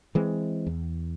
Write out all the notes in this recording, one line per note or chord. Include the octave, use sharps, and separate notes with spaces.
E3 G#3 C4
E2